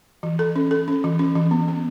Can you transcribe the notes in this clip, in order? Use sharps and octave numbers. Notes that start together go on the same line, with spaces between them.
E3
A4
C#4
A4
C#4
E3
C#4
E3
B3
B3